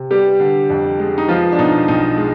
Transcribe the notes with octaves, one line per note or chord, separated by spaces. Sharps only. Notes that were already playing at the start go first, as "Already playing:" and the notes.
Already playing: C3
G3 B3 G4
D3
F2
G#3
D#4
F3 B3 F4
D4
B2 D#4
B1 D#4
G#3